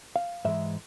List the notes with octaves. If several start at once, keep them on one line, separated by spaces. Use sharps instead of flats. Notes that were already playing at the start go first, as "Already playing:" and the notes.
F5
G#2 E3 G#3 E5